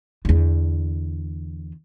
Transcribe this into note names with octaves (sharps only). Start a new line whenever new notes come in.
E2 D3